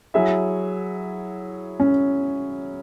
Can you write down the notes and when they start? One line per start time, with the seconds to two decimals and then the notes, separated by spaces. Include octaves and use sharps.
0.14 F#3 E4 G#4 E5
1.80 C#4